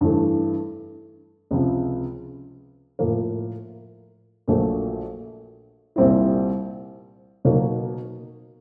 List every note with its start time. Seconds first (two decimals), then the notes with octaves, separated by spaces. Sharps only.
0.01 G2 E3 A3
1.51 C#2 C3 F3
2.99 A2 F3 A#3
4.48 A#1 A#2 F#3 A3
5.96 C2 A#2 G3 C4 E4
7.45 B2 F#3 A#3 D#4